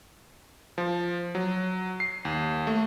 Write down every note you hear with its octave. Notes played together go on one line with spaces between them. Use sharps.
F3
F#3
C7
D#2
A3